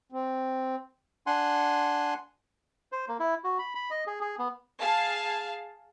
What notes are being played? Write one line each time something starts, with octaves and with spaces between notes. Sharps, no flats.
C4
D4 F#5 G#5 C6
C5
A#3
E4
F#4
B5
B5
D#5
G#4
G#4
B3
G#4 F5 A5